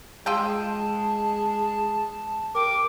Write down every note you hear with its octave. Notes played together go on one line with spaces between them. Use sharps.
G#3 F4 A4 G5 A5
A#4 G5 D6